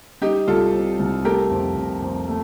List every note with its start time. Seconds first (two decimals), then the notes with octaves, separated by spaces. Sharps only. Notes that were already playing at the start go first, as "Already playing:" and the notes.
0.21 G3 D#4 G4
0.47 C2 F4 A4
0.74 C3
0.99 C2
1.24 A3 G4 A#4
1.51 F2
1.76 F2
2.02 F2
2.28 A3